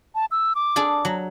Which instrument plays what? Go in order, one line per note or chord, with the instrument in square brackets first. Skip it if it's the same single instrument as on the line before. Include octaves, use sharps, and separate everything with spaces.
[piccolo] A5
E6
D6
[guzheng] D4 G#4 A4
F#3